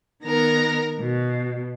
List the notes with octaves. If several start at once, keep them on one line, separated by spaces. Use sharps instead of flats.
D#3 B3 A#4 A#6
B2